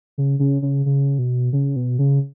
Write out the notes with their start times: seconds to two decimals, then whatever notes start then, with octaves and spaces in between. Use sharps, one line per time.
0.18 C#3
0.39 C#3
0.62 C#3
0.86 C#3
1.19 B2
1.53 C#3
1.76 B2
1.99 C#3